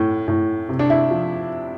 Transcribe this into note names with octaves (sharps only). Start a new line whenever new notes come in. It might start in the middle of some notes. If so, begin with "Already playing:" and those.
Already playing: A2
A2
C3
D4
E4
F3